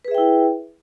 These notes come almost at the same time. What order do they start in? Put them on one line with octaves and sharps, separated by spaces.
B4 G#4 E5 G5 E4